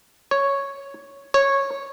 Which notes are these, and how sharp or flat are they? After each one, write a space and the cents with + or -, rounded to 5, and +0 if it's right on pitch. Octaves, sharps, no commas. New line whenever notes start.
C#5 +0
C#5 -10